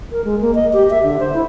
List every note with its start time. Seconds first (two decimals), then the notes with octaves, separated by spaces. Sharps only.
0.12 A#4
0.24 G#3
0.41 A#3
0.55 D#5
0.73 G4
0.90 E5
1.03 D3
1.20 C5
1.34 E4